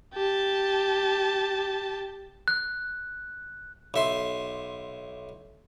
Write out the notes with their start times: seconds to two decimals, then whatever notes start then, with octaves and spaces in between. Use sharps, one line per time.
0.14 G4 A5
2.48 F#6
3.94 B1 E5 C6